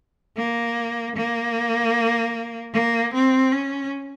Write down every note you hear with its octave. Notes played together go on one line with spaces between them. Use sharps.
A#3
A#3
A#3
C4
C#4